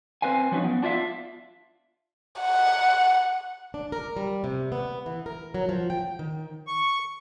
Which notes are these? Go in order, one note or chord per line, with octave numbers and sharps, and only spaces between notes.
C4 B4 C5 F5 G#5
F3 F#3 B3 C#4 D#4
B3
D4 F4 C#5 E5 F5
F#5
D4
A#4
G3
C3
B3
E3
A#4
F#3
F3
G5
D#3
C#6